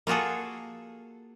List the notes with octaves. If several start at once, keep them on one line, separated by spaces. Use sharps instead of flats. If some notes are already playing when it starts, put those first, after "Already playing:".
A#3 F4 F#4 G#4 A4